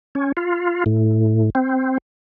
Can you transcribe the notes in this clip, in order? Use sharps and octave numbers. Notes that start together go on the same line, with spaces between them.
C#4
F4
A2
C4